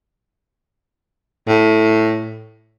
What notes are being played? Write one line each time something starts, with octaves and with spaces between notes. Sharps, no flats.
A2